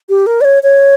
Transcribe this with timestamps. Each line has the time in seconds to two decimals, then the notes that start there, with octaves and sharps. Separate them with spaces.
0.09 G4
0.26 A#4
0.41 D5
0.45 C#5
0.63 C#5